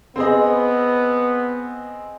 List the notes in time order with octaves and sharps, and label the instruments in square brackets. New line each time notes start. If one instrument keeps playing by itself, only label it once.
[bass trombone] B3 [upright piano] C4 G#4 D#5